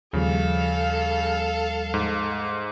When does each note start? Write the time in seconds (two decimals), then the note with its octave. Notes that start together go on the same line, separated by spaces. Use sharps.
0.13 D#2 C#3 F3 G3 A4 F5
1.94 G#2